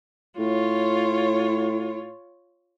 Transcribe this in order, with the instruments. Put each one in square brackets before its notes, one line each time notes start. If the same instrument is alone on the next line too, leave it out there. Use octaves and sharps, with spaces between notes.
[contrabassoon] A2 [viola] F4 C#5